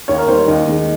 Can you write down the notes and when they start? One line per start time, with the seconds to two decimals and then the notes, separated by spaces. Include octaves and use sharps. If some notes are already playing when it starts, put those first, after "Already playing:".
0.08 D#2 C#5
0.18 A#4
0.28 D#3 G3 C5
0.37 C#5
0.48 D#2 D#5
0.67 D#3 G#3